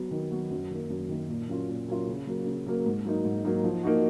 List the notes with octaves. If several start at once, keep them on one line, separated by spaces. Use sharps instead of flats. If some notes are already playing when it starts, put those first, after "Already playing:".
Already playing: F#3 B3 F#4
D#3
F#3 B3 F#4
F#2
D#3 A#3
F#2
D#3 A#3
A#2
F#3 A#3 C#4 F4
A#2
F#3 A#3 C#4 F4
C#3
F#3 A#3
C#3
F#3 A#3
G#2
F#3 A#3 D#4
G#2
F#3 A#3 D#4
F3
A#3 D#4 F#4